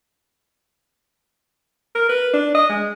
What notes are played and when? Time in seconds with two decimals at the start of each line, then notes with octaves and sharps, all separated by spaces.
1.95 A#4
2.09 B4
2.33 D4
2.54 D#5
2.69 G#3